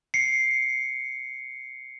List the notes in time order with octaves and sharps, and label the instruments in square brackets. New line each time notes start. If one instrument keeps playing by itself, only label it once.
[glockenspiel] C7 C#7